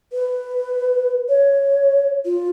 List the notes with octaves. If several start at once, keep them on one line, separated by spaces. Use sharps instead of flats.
B4
C#5
F4